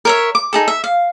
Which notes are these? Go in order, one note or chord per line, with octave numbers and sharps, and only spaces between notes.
A#4 C#5 E5
D6
D#4 G#4 A4
E5
F5